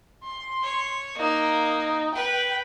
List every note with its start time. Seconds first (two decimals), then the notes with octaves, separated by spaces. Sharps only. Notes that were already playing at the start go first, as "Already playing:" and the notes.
0.24 C6
0.64 C#5
1.17 A#3 D#4
2.15 B4 G5